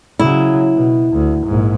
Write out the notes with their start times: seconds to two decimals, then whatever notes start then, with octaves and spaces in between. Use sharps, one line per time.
0.19 C#3 F#3 E4
0.75 B2
1.13 D2
1.46 A#1 G#2